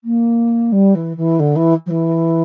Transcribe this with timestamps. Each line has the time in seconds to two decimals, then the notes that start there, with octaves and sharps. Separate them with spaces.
0.04 A#3
0.72 G3
0.95 E3
1.17 E3
1.39 D3
1.55 E3
1.86 F3
1.90 E3